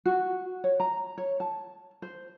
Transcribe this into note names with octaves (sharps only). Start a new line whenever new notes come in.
F#4
C#5
A#5
C#5
A5
C5